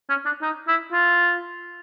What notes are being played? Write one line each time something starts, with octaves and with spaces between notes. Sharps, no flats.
C#4
D4
D#4
E4
F4